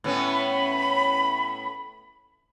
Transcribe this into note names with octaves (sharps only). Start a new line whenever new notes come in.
A2 B3 C#4
B5